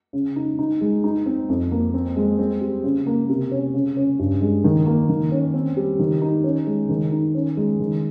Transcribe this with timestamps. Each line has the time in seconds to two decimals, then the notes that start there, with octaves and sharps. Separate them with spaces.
0.13 C#3
0.36 D#4
0.59 D#4
0.81 G#3
1.04 D#4
1.26 C4
1.49 F2
1.71 A#3
1.94 C4
2.16 G#3
2.39 C4
2.61 G3
2.84 C#3
3.06 A#3
3.29 C3
3.51 C#4
3.74 C#3
3.97 C#4
4.19 G2
4.41 G#3
4.64 D#3
4.86 A#3
5.09 D#3
5.32 C#4
5.54 C4
5.77 G3
5.99 D#3
6.22 D#4
6.44 C#4
6.66 G#3
6.89 D#3
7.12 D#4
7.35 C#4
7.57 G#3
7.79 D#3